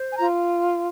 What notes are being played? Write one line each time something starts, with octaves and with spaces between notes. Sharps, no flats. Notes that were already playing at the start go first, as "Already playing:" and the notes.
Already playing: C5
G#5
F4 A#5